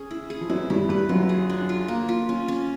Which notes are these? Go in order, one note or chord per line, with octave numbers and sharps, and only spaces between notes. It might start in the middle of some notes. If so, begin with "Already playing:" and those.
Already playing: C#4 G#4
E4
G#4
F3
F#2 F#3 E4
G2 G3 E4
G2 G3 B4
F#2 F#3 F4
G#4
D4
F4
A#3
F4
C#4
C#4